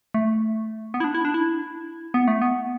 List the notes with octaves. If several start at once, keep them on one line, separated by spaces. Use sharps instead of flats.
A3
B3
E4
D4
E4
D4
E4
B3
A3
B3